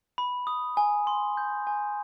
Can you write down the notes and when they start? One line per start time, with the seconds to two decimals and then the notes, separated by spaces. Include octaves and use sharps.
0.18 B5
0.47 D#6
0.77 G#5
1.07 C6
1.37 G6
1.67 G#5